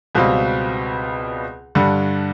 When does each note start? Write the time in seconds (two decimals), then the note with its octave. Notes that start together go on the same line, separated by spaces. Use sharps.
0.15 C#2 B2 G3 C4 F4
1.75 G2 D3 G3